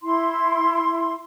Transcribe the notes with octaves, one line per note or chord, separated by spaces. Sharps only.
E4 C6